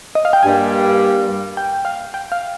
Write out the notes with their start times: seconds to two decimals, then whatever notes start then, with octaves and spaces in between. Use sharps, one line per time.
0.15 D#5
0.25 F5
0.33 G5
0.43 G2 G3 A#3 G#5
1.57 G5
1.85 F5
2.14 G5
2.32 F5